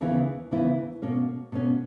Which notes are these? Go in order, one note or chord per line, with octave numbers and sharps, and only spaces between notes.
D#2 C#3 E3 B3 E4
D#2 C#3 E3 B3 E4
B2 A#3 C#4
B2 A#3 C#4